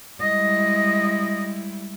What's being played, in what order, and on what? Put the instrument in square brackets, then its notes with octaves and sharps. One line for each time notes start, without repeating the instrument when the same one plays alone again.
[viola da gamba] G3 G#3 E4 [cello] D#5